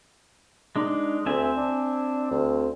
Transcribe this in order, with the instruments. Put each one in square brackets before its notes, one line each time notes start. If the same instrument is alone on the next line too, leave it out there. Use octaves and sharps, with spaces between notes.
[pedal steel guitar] G#3 D4 D#4
[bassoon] D2 [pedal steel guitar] C4 E5 G#5
[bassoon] D4
D2